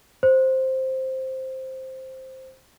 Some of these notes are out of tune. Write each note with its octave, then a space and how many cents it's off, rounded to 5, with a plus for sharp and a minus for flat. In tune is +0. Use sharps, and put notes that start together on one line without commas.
C5 +5